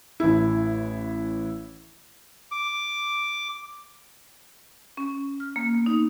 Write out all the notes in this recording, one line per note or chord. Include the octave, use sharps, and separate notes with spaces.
A1 E4
D6
C#4
F6
A#3
B3
D#4